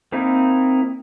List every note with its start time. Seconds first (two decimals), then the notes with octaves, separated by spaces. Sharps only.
0.12 A#3 C4 D#4 E4